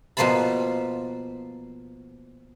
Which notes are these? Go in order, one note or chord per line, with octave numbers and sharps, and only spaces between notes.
B2 F3 A#3 C5 A5 B5